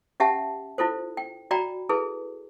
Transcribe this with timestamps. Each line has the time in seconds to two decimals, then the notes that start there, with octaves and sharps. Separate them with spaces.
0.20 C#4 G4 E5 F#5 A5
0.78 E4 F4 A4 C5
1.17 G5
1.51 F#4 D5 G5 A#5 B5
1.89 E4 G#4 A4 B4